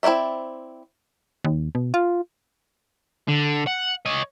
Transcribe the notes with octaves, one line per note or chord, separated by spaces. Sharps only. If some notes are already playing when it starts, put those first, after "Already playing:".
C4 E4 F4 D5 E5
D#2
B2
F4
D3
F#5
C#5 D#5